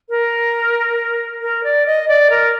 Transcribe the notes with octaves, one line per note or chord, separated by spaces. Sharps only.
A#4
A#4
D5
D#5
D5
A#4